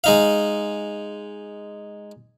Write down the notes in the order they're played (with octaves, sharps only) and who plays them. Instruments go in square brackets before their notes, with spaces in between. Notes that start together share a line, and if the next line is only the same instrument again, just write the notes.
[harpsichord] G#3 D#4 F5